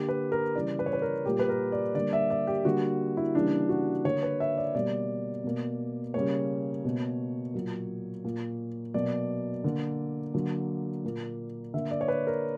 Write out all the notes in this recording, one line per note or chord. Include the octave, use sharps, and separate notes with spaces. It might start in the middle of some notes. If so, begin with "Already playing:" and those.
Already playing: D3 A#3 G4
B4
A#4
C#3 E3 G3 D5
B4
C#5
B4
A#4
A#2 G3 A#3 G4
B4
A#4
D5
D3 G3 A#3 D5
E5
D5
G4
D3 G3 A#3 F#4
E4
C#3 E3 G3 A#3 D4
F#4
D3 A#3 C#5
B4
E5
D5
B2 G3 A#3 D5
B2 A#3
C#3 G3 A#3 C#5
B2 A#3
A#2 F#3 A#3
A#2 A#3
B2 F#3 A#3 D5
D3 A#3
D3 F#3 A#3
A#2 A#3
D3 A#3 E5
D5
C#5
B4
A#4